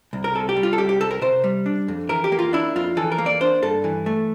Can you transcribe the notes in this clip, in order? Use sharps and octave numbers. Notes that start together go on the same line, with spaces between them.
C2
A#4
C3 A4
G4
G3
F4
A4
C2 G4
G4
C2 A4
A#4
C3 C5
G3
D4
F2
E3 A#4
G4
A#3
F4
D4 E4
F2 F4
E3 A4
A#4
A#3
D5
D4 C5
G2 A4
E3
A3